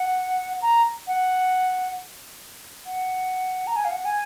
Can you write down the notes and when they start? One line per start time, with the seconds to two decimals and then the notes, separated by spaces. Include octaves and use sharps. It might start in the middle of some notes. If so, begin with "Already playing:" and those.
Already playing: F#5
0.62 A#5
1.08 F#5
2.86 F#5
3.67 A#5
3.76 G#5
3.85 F5
3.91 F#5
4.05 G#5